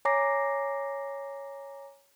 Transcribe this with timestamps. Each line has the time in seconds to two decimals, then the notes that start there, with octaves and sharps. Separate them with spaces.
0.05 C#5 G#5 A#5 D6 A#6 C7